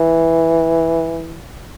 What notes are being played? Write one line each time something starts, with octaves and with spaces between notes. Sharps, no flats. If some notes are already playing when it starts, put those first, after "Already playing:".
Already playing: E3